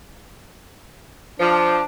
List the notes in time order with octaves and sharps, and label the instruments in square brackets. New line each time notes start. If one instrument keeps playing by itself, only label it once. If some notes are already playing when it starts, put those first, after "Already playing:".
[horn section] F3 [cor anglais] D4